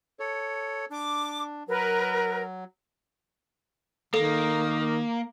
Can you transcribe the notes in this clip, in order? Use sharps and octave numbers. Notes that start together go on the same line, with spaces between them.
A4 C#5
D4 D6
F#3 A#4 B4
D#3 A#3 A4